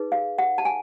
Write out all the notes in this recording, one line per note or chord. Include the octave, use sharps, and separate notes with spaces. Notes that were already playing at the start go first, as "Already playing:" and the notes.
Already playing: D#4 G#4 B4
F5
F#5
A5
G#5